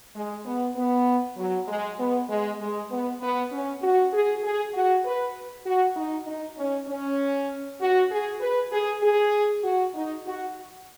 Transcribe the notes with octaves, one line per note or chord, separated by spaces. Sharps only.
G#3
B3
B3
F#3
G#3
B3
G#3
G#3
B3
B3
C#4
F#4
G#4
G#4
F#4
B4
F#4
D#4
D#4
C#4
C#4
F#4
G#4
B4
G#4
G#4
F#4
D#4
F#4